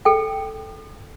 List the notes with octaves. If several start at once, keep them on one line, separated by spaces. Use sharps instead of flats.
A4 G5